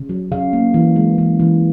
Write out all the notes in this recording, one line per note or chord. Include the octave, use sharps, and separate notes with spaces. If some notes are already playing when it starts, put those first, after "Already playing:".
Already playing: C#3
F#3
C#3 F5
A#3
E3
G#3
E3
E3